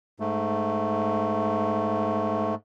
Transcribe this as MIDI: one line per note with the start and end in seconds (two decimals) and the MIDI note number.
0.20 2.55 44
0.20 2.55 57